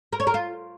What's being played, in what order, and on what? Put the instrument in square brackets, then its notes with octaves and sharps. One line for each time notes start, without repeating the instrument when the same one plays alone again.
[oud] A#4
C#5
A#4
F4